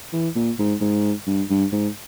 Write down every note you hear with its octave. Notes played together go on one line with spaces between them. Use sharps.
E3
A#2
G#2
G#2
G2
G2
G#2